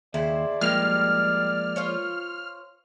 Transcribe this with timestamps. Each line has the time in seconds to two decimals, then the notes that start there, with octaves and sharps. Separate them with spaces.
0.14 D#2 C#3 E4 C5 D5
0.61 F3 G3 G#3 A#3 F6
1.76 F4 C5 C#5